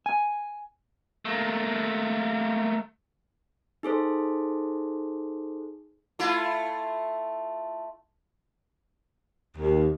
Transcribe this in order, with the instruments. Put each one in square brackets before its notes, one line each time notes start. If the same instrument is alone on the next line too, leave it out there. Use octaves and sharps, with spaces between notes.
[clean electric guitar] G#5
[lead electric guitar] A3 A#3
[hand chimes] D#4 G#4 A4 C5
[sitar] A3 E4 F4
[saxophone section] D#2